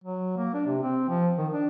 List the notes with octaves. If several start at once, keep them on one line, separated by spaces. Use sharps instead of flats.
F#3
A#3
D4
C3
C4
F3
D#3
D4